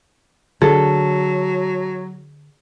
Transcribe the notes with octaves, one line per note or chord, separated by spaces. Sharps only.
D3 F#3 G#4 A4